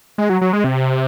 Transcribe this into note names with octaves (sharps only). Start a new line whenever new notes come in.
G#3
F#3
F#3
G#3
C3